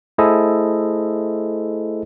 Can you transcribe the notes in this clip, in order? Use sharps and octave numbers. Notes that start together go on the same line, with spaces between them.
A3 E4 G#4 A4 C5 D#5